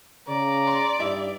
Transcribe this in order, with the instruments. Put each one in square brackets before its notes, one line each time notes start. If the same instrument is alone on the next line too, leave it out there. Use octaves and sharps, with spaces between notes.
[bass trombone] C#3 [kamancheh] D5 [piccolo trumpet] A#5
[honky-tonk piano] C6
[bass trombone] G2 [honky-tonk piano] D#4 E4 E5